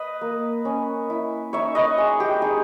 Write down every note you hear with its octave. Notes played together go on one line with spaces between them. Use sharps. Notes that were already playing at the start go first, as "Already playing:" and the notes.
Already playing: B4 D#5
A#3
C#4
E4
D#4 C#5 E5
B4 D#5
G#3 G#4
G4
D#4 G#4